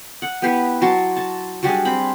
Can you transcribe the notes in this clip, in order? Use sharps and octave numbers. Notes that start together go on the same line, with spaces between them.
F#5
B3 E4 G4 B4
F#3 A5 C6 D6
A5
F#3 G3 D4 G#4
C4 B5